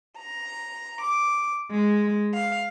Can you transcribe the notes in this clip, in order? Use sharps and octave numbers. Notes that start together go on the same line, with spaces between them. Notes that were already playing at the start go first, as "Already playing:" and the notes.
A#5
D6
G#3
F5